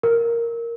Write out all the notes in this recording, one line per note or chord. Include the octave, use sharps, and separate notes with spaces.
A#4